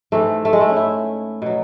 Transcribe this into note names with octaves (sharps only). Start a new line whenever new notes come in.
G#2 E3 A3
A3
G#3
A3
C#4
E4
B2 F#3